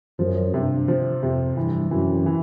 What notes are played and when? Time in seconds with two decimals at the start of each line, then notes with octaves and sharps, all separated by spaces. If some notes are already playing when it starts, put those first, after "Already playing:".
0.19 F#2 F3
0.53 G2 C3
0.88 F3
1.22 F2 C3
1.57 G2 E3
1.91 F#2 E3
2.26 E3